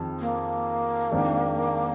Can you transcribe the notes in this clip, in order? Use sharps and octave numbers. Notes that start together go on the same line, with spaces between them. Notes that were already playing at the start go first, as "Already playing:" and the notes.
Already playing: F2 D#3 F4 G#4
A#3
F2 D#3 G#3 D4